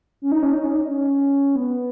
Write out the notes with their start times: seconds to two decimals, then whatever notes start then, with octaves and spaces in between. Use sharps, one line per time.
0.22 C#4
0.32 D#4
0.43 C#4
0.53 D#4
0.64 C#4
0.75 D#4
0.86 C#4
1.56 B3